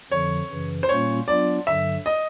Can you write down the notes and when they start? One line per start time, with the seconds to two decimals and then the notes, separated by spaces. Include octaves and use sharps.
0.10 F2 D3 F3 C#5
0.50 F#2 C#3 E3
0.83 C5
0.89 A#2 G3 A#3 C#4 F4 C#5
1.28 F#3 B3 D4 F4 D5
1.67 G2 D3 F#3 E5
2.06 D#5